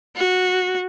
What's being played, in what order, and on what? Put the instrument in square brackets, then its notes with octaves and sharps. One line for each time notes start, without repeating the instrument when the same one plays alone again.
[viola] F#4